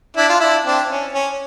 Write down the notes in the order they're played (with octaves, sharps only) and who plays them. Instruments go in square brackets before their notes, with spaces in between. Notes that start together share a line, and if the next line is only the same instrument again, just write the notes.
[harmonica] D4 E4
F4
D4 E4
C4 D4
C#4
C#4